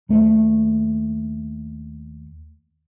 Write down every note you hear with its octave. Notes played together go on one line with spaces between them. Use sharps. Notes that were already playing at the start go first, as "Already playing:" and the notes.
D#2 A3